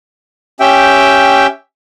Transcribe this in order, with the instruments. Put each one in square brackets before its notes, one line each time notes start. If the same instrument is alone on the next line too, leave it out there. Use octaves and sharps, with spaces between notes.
[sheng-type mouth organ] C#4 G4 E5 G5